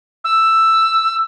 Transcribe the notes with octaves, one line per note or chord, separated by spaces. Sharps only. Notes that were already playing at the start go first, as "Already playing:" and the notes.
E6